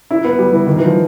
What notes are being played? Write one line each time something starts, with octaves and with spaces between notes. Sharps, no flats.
E4
B3
G3
E3
D#3
E3
F3